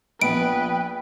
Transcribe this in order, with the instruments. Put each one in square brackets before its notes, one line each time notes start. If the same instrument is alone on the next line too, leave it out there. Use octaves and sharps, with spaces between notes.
[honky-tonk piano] A#1 B3 [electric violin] B4 [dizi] G5 [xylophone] D7